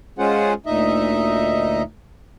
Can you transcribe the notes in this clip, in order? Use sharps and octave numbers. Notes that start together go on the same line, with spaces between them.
G#3 C#4 F4 G#4 C5 F#5
D2 A#2 D#4 D#5 E5